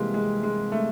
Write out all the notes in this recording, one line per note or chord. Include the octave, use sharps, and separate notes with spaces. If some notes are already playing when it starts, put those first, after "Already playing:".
Already playing: C3 E3 G3 G#3 A#3
G#3
G#3
A3